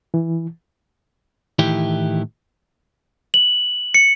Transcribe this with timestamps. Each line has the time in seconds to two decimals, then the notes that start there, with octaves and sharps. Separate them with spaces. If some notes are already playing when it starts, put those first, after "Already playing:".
0.14 E3
1.59 A2 D#3 E3 E4 G4
3.34 F#7
3.94 C#7